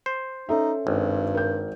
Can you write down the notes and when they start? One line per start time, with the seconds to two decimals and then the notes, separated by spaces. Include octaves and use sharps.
0.06 C5
0.49 C#4 D#4 A4 E5
0.87 G#1 G2
1.35 A#4 G6